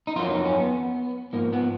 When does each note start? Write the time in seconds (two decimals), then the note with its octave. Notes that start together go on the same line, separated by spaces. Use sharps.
0.07 D#4
0.16 F2 D#3 F#3 F4
0.30 D#4
0.45 C#4
0.60 B3
1.33 G#2 F3 A#3
1.53 B3